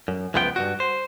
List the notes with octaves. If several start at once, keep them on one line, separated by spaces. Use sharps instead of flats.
F#2
C#2 F#2 F3 B3 F5 G5
G2 A#2 F#4
C5